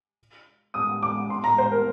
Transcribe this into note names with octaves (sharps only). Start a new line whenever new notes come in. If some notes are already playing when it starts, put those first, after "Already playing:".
D#6
D6
C6
A#5
C5
A#4